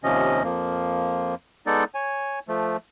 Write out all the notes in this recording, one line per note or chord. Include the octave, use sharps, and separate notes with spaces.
D#2 C3 F3 C#4 D#5
F2 F3 A#3
G#3 B3 D#4 A4 D5
C#5 G#5
F3 A3